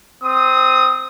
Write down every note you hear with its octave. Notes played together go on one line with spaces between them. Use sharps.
C4 D#6